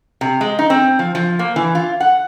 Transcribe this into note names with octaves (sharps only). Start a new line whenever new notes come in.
C3
G#3
D#4
C4
F3
F3
A#3
E3
F4
F#5